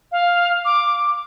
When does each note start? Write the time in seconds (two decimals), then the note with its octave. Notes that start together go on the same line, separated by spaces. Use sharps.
0.12 F5
0.65 D6